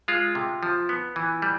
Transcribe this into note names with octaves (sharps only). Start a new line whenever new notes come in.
G#3 F4
C3
F3
B3
E3
G3